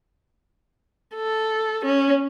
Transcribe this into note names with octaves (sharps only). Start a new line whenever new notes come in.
A4
C#4